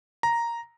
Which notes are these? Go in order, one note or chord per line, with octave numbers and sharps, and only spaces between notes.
A#5